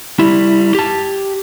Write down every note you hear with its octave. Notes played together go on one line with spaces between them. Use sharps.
G3 E4
G4 A5